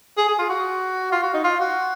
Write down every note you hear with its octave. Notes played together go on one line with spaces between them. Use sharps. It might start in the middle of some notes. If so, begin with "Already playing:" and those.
G#4
G#4
F4
F#4
F4
F#4
D#4
F4
F#4